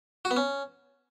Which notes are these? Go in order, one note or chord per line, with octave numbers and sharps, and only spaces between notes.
F#4
B3
C#4